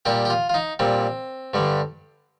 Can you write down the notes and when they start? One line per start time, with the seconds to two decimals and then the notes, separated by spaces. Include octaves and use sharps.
0.05 A#2 G3 G4
0.25 G4
0.30 F4
0.49 F4
0.54 D#4
0.79 A#2 G3 C4
1.54 G2 D3 G3